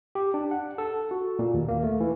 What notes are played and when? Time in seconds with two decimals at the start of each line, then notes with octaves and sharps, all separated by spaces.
0.15 G4
0.34 D4
0.51 F#5
0.78 A4
1.11 F#4
1.39 A#2
1.54 D#2
1.68 A#3
1.84 A3
2.00 E3